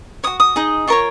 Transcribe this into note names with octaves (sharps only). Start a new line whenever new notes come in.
F#4 C#5 D#6
D#6
D#4 G#4 D#5
F4 A#4 C#5 C#6